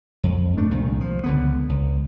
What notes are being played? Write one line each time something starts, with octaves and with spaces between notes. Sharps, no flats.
F2
G#2 A3 D4
C2 A#2 D#3
F3
C#2 D3 B3
C#2